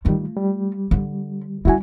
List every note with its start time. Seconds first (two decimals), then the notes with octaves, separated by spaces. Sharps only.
0.05 D#3 G3 A3 F4
0.37 G3
0.91 D3
1.65 G3 C#4 E4 F#4 G#5